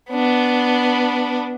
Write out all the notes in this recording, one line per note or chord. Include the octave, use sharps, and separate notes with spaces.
B3 D4